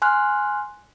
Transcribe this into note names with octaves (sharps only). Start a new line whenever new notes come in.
G#5 C6 F6 F#6